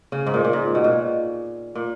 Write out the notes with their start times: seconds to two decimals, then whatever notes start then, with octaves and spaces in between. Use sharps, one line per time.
0.12 C#3
0.26 G#2
0.34 A#2
0.45 A#2
0.53 G#2
0.75 B2
0.84 A#2
1.75 A#2